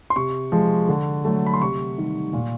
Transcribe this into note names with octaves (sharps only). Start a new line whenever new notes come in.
C6
C3 C#6
F3 G#3
D3
F#3 A3
B5
C6
C3 C#6
D#3 G3
A#2